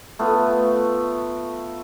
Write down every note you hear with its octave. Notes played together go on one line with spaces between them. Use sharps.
A3 B3 F4